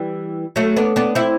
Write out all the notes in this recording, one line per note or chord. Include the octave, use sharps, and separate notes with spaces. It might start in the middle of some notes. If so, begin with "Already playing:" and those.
Already playing: E3 G3
F#3 A3
B3 D4
B3 D4
C4 E4